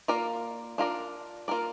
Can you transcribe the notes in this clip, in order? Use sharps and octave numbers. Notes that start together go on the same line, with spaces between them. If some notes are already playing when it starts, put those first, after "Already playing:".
A#3 F4 A#4 D5
D4 F4 A#4 D5
A#3 F4 A#4 D5